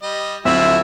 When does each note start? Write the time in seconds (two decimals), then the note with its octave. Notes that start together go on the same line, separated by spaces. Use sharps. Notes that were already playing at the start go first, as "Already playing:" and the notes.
0.02 G3 D#5
0.45 D1 F3 C4 E4 F#4 E5